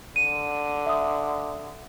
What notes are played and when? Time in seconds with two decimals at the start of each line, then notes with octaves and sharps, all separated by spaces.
0.16 D3 D#7
0.86 E5 D#6